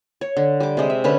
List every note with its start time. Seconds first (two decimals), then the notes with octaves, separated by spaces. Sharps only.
0.21 C#5
0.37 D3
0.60 G3 D6
0.77 C3 G#3
0.90 E5
1.04 D3 C#4 B4